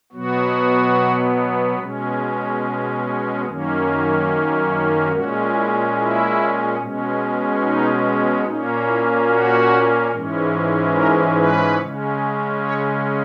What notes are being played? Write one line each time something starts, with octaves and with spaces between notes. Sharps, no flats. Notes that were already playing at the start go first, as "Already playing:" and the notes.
B2 F#3 B3 F#4
B2 G#3 C#4
F#2 D#3 A#3 C#4
A#2 G#3 C#4 F#4
E4
E4
B2 G#3 C#4
D#4
A#2 A#3 C#4 D#4
E4
F#4
G#2 E3 G#3 C#4
A#4
B4
C#3 G#3 C#4
C#5